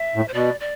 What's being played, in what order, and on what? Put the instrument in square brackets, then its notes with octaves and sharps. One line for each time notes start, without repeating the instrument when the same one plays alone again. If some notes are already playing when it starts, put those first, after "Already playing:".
Already playing: [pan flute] E5
[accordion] A2
[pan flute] C5
[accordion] B2 [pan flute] D5
[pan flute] D5